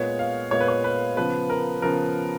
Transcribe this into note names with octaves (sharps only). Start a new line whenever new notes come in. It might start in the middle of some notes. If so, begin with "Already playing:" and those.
Already playing: A#2 G#3 B3 C#5
F5
A#2 G#3 B3 C#5
B4
C#5
B4
C#3 F3 B3 B4
A#4
C#3 F3 B3 A#4